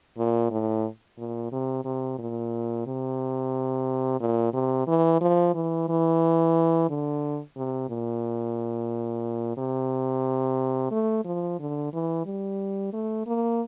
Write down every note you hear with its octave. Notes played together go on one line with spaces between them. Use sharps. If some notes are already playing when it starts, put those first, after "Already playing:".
A#2
A2
A#2
C3
C3
A#2
C3
A#2
C3
E3
F3
E3
E3
D3
C3
A#2
C3
A3
F3
D3
E3
G3
A3
A#3